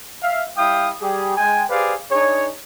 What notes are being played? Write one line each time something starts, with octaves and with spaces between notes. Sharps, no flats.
E5 F5
G3 E4 G4 F5 G5 D#6
G3 G4 G#4
G#3 G5 G#5
G4 G#4 B4 C5 D5 F5
D4 D#4 G#4 C#5